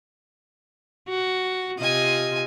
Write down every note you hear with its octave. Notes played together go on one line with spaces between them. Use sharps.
F#4
C3 F4 D#5 G#5